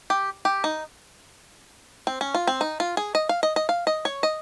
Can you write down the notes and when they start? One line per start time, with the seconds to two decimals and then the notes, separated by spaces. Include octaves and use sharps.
0.10 G4
0.45 G4
0.64 D#4
2.07 C4
2.21 C#4
2.35 F4
2.47 C4
2.61 D#4
2.80 F4
2.97 G#4
3.15 D#5
3.29 F5
3.43 D#5
3.56 D#5
3.69 F5
3.87 D#5
4.05 C#5
4.23 D#5